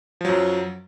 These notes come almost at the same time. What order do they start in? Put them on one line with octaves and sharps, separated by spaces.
F3 F#3 F#2